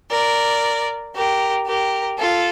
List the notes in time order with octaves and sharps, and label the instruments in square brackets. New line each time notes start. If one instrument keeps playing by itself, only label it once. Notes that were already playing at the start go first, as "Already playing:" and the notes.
[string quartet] A#4 D5
G4 A#4
G4 A#4
F4 A4